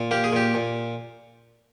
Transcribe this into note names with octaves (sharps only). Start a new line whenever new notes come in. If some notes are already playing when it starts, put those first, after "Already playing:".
Already playing: A#2
A#3 G4
G#4
A#2 G4
A#2